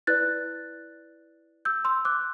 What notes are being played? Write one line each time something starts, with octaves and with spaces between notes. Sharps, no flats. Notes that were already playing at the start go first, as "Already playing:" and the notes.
E4 B4 D5 F#6 A6
E6 G6
C6 E6
D6 F#6